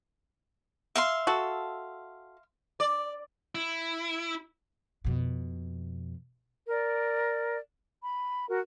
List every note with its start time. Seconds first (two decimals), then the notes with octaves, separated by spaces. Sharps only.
0.96 E5 F5 C6
1.27 F#4 A4
2.80 D5
3.55 E4
5.04 F2 B2
6.68 A#4 D5
8.00 B5
8.49 F#4 A#4